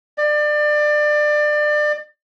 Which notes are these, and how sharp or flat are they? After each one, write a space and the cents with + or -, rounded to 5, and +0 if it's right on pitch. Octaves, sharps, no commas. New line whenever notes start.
D5 +25